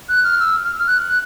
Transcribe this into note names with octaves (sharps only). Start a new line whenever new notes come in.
F#6
F6
E6
F6
F#6